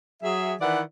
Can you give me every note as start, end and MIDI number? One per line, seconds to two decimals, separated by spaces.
0.22 0.52 54
0.22 0.52 68
0.22 0.52 76
0.60 0.80 51
0.60 0.80 52
0.60 0.80 64
0.60 0.80 71
0.60 0.80 74
0.60 0.80 78